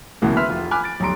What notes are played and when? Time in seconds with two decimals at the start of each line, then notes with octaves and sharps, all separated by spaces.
0.22 C#2 B2 E3 G#3 A#3
0.37 B4 E5 B5 C6 F6
0.49 F1 F4
0.71 G#5 B5 D6 F6 F#6
0.84 A6 D7
1.00 B1 F2 G3 A#5 C6 D7